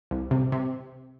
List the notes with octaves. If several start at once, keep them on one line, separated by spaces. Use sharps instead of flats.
C2
C3
C3